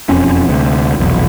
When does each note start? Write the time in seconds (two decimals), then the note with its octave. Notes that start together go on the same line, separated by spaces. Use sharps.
0.09 E1 F2 C4 C#4
0.49 D2 C3
0.99 F1 B1 E2